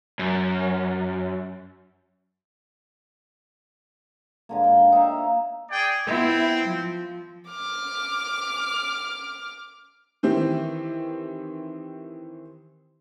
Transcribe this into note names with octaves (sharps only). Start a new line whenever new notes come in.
F#2
G#2 D3 A#3
G5
D#4 C#5 E5 F5
G#4 D5 G5
B3 C4 E4
F3
D6 F6
D#3 E3 C4 G4